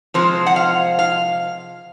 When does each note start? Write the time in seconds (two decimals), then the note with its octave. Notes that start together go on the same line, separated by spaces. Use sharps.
0.14 C3 F3 G#3 C4 C5
0.47 F#5
0.56 F5
0.99 F5